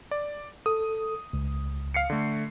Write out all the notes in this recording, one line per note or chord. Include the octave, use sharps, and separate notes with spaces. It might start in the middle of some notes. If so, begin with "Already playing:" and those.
D5
A4 D#6
C#2
F5 C7 C#7
D3 A3